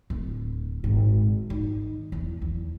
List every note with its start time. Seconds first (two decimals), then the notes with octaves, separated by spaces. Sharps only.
0.10 D1
0.84 G#1 A#2
1.50 D#3
2.12 E2
2.42 E2